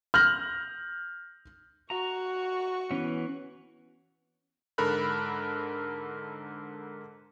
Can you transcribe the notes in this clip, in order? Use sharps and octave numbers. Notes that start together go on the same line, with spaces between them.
F6 G6 A#6 F#7
F#4 A#5 C#6
E3 B3 C#4
G#2 D3 A4 A#4 B5 F#6